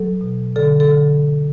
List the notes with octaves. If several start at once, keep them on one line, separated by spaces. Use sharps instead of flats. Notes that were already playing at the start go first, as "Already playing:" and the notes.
Already playing: F#3 A4
B2
D3 A4
A4
D3